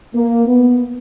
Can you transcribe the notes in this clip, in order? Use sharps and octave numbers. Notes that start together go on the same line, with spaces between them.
A#3
B3